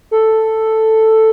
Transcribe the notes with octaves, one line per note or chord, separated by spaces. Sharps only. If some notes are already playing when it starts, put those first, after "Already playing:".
A4